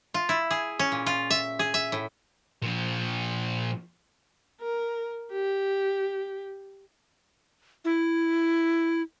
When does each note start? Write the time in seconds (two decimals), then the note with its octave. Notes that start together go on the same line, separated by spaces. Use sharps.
0.14 F4
0.29 E4
0.51 G#4
0.79 C#4
0.92 A#2
1.06 F4
1.30 E5
1.59 G#4
1.74 E5
1.92 A2
2.62 A#2 F3
4.61 A#4
5.32 G4
7.85 E4